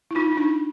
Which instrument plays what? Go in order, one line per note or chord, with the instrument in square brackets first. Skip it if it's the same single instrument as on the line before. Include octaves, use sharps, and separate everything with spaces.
[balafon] E4
D#4 F4
D#4
D4 E4